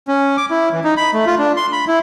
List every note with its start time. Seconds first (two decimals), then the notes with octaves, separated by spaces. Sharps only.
0.08 C#4
0.37 D6
0.51 E4
0.73 E3
0.84 D#4
0.97 B5
1.14 A3
1.27 F4
1.39 D4
1.57 C6
1.73 B5
1.88 E4